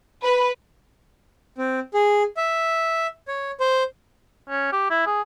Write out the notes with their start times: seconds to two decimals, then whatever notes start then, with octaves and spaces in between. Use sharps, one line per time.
0.23 B4
1.58 C4
1.94 G#4
2.37 E5
3.28 C#5
3.60 C5
4.49 C#4
4.72 G4
4.90 E4
5.06 G#4